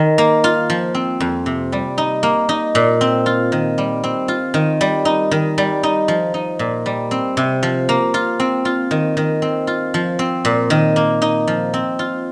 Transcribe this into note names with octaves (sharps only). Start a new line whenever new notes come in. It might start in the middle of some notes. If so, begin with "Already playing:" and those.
Already playing: D#3
A#3
F4
F3
C4
F2
C3
G3
D#4
A#3
D#4
A#2
C4
F4
D#3
G3
C4
F4
D#3
G3
D#4
D#3
G3
D#4
F3
D#4
A#2
G3
C4
C3
F3
A#3
F4
C4
F4
D#3
D#3
C4
F4
F3
C4
A#2
D#3
A#3
D#4
F3
C4
F4